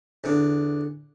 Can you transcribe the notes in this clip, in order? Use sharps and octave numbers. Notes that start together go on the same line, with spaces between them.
E2 D3